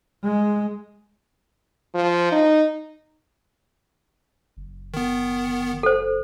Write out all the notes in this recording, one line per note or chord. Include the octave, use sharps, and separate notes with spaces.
G#3
F3
D#4
F#1
D#3 B3
A4 C5